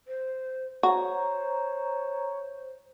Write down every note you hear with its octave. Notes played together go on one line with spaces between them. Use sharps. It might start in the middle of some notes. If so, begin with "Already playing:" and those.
C5
F#4 C5 C#5 A#5